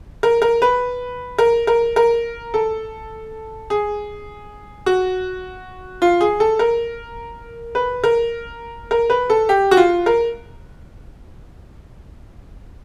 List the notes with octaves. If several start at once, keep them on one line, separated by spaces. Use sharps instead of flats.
A#4
A#4
B4
A#4
A#4
A#4
A4
G#4
F#4
F4
G#4
A4
A#4
B4
A#4
A#4
B4
A4
G4
F#4
F4
A#4